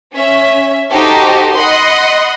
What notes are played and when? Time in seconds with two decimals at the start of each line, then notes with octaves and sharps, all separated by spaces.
0.15 C#4 E5
0.90 D#4 F#4 G4 A4 C5
1.55 D#5 F#5 B5 C6